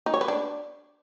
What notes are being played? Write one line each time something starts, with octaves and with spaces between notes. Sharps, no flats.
D#4
C#5
B4
D4